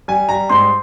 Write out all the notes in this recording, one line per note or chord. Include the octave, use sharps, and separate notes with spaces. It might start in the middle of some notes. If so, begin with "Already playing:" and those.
G3 G#5
G3 A#5
G#2 C6